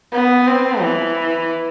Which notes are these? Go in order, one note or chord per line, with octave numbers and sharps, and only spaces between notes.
B3
C4
E3